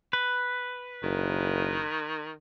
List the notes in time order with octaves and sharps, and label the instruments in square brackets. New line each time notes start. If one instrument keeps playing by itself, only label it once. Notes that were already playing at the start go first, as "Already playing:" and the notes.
[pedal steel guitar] B4
[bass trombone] F#1 [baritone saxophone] D#3